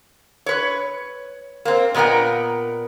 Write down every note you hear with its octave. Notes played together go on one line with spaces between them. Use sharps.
B4 C#5
A#3 C4
A#2 B3 A#4 D#5 G5